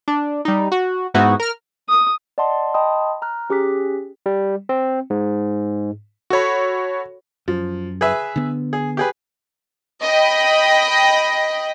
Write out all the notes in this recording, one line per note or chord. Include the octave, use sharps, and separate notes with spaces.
D4
G3 D#4
F#4
G#2 B3 D#4 E4 F#4
A#4 F6
D#6
D5 D#5 F#5 A5 C6
D#5 G5 A5 B5 C6 D#6
A#5 F6 F#6
C#4 G4 G#4 D6 F#6 B6
G3
C4
G#2
F#4 A4 C#5 B5
F#2 F3
G#4 B4 E5
D3 B3
G#4
G4 G#4 B4
D#5 G5 B5